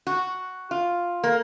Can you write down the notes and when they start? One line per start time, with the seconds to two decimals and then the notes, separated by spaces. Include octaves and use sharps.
0.07 F#4
0.71 F4
1.24 A#3